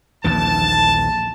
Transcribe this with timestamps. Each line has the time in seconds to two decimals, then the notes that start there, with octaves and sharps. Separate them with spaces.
0.24 A#1 D#2 E3 A5